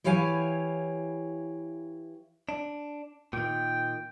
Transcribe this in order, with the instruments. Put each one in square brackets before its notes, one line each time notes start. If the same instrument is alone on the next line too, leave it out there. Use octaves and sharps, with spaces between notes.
[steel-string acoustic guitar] E3 E4 G4 C#5 F5 G#5
[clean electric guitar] D4
[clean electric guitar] A#2 D#3 [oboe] G5